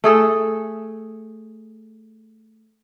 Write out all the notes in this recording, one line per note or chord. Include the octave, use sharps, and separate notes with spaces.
A3 G#4 A4